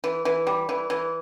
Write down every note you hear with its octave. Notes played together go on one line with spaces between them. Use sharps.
E3
E3
G3
E3
E3